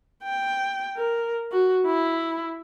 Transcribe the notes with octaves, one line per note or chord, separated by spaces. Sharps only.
G5
A#4
F#4
E4